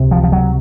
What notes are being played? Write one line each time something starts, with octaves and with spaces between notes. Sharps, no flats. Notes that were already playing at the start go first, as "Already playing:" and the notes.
Already playing: C#2 C3
F3
F3
F#3